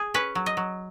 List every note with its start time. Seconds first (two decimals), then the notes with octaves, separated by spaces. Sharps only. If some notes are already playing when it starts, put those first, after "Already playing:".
Already playing: G#4
0.14 C#4 B4
0.35 F#3
0.46 D#5
0.57 F#3